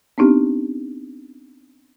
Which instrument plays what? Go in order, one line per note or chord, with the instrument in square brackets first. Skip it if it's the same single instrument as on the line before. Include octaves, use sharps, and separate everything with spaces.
[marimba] B3 C4 D4 D#4 G4